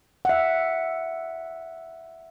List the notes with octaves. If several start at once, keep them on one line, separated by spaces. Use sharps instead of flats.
E5 F#5